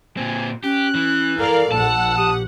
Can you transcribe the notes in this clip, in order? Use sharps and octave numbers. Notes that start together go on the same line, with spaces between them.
A#2 C4 G#5
C#4 G4 F#6
E3
A4 A#4 D5 F5
A#1 F#5 A5 E6
G4 D#6